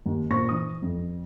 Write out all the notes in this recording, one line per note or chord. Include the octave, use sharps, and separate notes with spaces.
D#2
A#2 C5 C#6 A#6
E3 D#6
F2